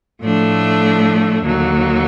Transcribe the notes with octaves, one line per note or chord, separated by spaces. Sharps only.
A2 F3 A3 D4
D#2 D3 F#3